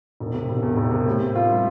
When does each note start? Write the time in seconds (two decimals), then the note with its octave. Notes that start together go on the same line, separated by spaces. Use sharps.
0.20 E1
0.34 C3
0.49 E1
0.62 E2
0.77 E1
0.91 C3
1.06 A2
1.21 C4
1.35 F4
1.50 G3